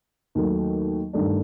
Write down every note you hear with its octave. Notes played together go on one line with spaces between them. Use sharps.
D#2 D#3 F#3 A3
G2 D#3 A3 D4